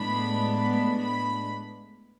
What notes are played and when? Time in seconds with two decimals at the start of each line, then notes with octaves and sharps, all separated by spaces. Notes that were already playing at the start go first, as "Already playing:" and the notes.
Already playing: A2 G#3 B3 D4 B5
0.53 B5
0.98 B5